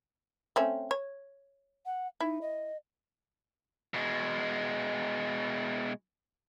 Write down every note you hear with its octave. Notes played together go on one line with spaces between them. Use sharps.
A3 C4 C#4
C#5
F#5
D#4 E4
D#5
B2 G#3